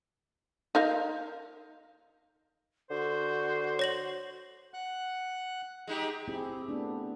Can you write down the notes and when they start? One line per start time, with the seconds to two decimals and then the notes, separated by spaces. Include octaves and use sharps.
0.75 D#4 A#4 F5
2.91 D3 F#4 C5
3.79 C#5 A#6 F#7
4.74 F#5 F#6
5.87 G#3 D#4 G4
6.28 C4 E4 G4 G#4
6.69 A3 B3 D4